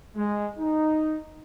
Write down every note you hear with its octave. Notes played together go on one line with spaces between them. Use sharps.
G#3
D#4